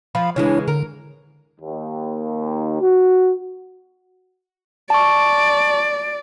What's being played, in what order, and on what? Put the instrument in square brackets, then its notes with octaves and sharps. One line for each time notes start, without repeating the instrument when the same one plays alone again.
[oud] F3 [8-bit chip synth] F5 B5
[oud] C#3 E3 G#3 [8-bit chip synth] D4 E4 C#5
[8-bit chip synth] D3 [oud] A#4
[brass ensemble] D#2
F#4
[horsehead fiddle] D5 [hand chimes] A5 C#6